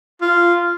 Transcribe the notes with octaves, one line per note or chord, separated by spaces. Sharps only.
F4